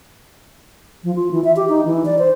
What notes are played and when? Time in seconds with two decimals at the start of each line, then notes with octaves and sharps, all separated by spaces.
1.04 F3
1.16 F4
1.31 E3
1.44 E5
1.56 G4
1.69 D#4
1.85 E3
2.06 D5
2.18 C5